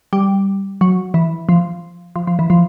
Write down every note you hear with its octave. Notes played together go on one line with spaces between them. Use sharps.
G3
F#3
E3
F3
F3
F3
E3
F3